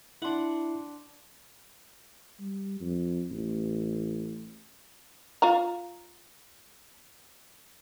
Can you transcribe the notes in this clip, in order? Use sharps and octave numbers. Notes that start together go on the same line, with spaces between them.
D4 E4 F#5 C6
G3
F2
A1
F4 F5 A#5